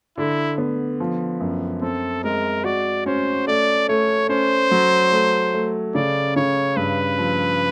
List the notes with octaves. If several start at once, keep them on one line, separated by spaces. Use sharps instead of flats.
D3 E4
B3
F3
F#2
C4 A4
G#3 A#4
F#4 D5
C#4 C5
A3 D5
A3 C#5
C#4 C5
F#3
A3
A3
C#3 D5
C#3 C#5
G2 B4
F3